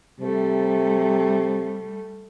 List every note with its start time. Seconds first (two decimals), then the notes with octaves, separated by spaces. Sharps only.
0.21 C3 G3 A3